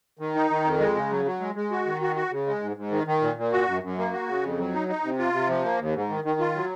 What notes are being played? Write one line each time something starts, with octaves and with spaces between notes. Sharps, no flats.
D#3
D#4
D#3
F2
G#3
C#3
F#3
F#3
G#3
G#3
F#4
D#3
F#4
F#4
C#3
G#3
G#2
G#2
D#3
D#3
A#2
A#2
F#4
F#2
F#2
A#3
F#4
C#3
F2
F#3
D#4
D#4
C3
F4
C3
F3
A#3
D#2
G#2
D#3
D#3
F4
F#3